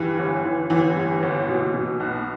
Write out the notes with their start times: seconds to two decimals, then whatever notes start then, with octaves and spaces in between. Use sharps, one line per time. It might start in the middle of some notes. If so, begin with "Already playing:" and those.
Already playing: G2 E3
0.19 G1
0.45 E3
0.70 G1 E3
0.96 G2
1.23 G1
1.48 B2
1.74 B2
2.00 B1